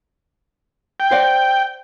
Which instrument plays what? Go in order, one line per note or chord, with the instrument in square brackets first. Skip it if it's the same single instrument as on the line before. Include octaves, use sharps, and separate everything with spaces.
[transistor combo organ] G5
[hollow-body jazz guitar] C5 D5 F#5